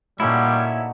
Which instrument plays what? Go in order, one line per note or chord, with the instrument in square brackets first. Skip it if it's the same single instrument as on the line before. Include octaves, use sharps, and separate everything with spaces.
[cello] A#2 [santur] F#3 A3 D#4 [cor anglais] G3 [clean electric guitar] C#4 E4